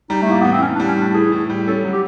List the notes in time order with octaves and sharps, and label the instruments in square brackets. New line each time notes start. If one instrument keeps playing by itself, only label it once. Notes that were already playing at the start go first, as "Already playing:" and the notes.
[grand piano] G3 [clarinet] D#4
[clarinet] A3
[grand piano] A2 [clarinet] A#3
[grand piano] E3 [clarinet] B3
[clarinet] C4
[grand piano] A2 [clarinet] C#4
[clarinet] D4
[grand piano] G3
[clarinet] C#4
[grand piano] A2 [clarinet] D4
[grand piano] E3 [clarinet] G#4
[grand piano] A2
G3
[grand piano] C#4 [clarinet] A4
[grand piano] F#3
[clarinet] G4